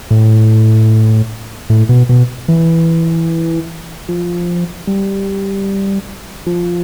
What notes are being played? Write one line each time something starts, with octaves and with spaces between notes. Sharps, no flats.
A2
A2
B2
B2
E3
F3
G3
F3